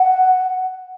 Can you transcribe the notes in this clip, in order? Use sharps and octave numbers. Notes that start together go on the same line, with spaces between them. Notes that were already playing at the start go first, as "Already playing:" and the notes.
Already playing: F#5